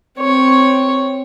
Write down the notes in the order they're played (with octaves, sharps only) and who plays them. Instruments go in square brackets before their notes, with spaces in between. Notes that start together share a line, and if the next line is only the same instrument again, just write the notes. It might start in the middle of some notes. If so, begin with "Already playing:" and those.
[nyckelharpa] C4 C#5